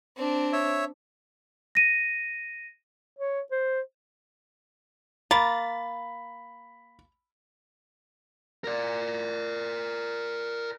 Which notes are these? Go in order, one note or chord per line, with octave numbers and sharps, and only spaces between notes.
C4 D4
C#5 E5
A#6 D#7
C#5
C5
A#3 A#5 B5 A6
A#4 D5